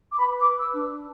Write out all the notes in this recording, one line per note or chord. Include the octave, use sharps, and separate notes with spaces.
D6
B4 B5
D6
B4
E6
D4